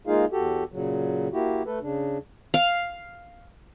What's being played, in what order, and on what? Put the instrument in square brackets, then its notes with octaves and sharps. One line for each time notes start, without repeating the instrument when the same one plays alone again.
[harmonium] G#3 A#3 D#4 F4 G#4 F5
E2 F#4 G4 A4
A#2 C#3 F#3
A#3 E4 F#4 G4
A3 A4 B4
C#3 D4
[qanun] F5